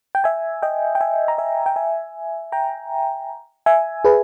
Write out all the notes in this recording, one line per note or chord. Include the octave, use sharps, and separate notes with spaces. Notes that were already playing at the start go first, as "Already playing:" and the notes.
G5
E5 G#5
D#5 G5
G5
E5 G#5
A#5
E5 G#5
G5
E5 G#5
G5 A#5
E5 G#5
G#4 B4